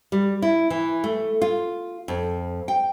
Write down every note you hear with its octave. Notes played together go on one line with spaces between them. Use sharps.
G3
E4
E3
A3
F4
F2
G5